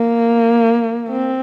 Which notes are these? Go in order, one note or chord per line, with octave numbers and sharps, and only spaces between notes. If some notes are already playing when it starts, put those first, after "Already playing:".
Already playing: A#3
C4